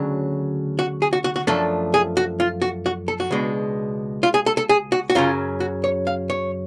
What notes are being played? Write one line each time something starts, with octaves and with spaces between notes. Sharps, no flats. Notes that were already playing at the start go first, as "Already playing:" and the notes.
Already playing: D2 C#3 F#3 D4
F#4
G#4
F#4
F#4
F#4
F#2 F3 A3 D4 A4
G#4
F#4
F4
F#4
F#4
A4
F#4
C#2 B2 G#3 D4
F4
G#4
A4
A4
G#4
F#4
F#4
F#2 C#3 F#3 C#4 F4
F#4
C#5
F5
C#5